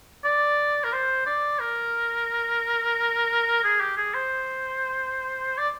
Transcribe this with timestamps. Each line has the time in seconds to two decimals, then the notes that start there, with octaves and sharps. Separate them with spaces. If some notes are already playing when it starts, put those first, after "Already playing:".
0.25 D5
0.84 A#4
0.93 C5
1.26 D5
1.59 A#4
3.64 G#4
3.80 G4
3.97 G#4
4.14 C5
5.58 D5